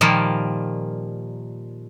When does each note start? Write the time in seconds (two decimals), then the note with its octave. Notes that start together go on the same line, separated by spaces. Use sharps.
0.01 A#2 D#3 F3 G3 A#3